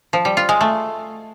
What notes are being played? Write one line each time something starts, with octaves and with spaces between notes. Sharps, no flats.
F3
G3
F4
G#3
A3